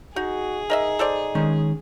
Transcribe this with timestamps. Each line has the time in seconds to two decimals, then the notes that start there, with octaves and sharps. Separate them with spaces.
0.16 D#4 F#4 G#4
0.70 D#4 A#4 D#5 E5
0.99 A4 C5 D5
1.35 D#3 G#3 C#4